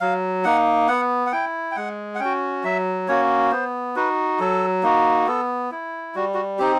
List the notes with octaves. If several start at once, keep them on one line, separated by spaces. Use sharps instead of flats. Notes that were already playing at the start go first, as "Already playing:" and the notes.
F#3 F5
A#3 D#4 F#5
B3 F#5
F#5
E4 G5
G5
G#3 F#5
F#5
C#4 F#4 G5
F#3 E5
A#3 C#4 F#4 C#5
B3 C5
D#4 F#4 B4
F#3 A4
A#3 D#4 F#4
B3 A4
E4
G3 F#4
F#4
C4 D#4 G4